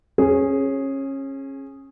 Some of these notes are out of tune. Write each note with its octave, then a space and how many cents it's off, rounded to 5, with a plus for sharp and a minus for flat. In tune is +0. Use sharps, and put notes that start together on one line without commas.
C#4 -25 G#4 +0